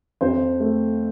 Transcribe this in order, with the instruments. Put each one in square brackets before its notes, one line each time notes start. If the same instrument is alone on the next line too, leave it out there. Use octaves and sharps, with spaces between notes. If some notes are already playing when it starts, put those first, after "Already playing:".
[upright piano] F2 C5
A3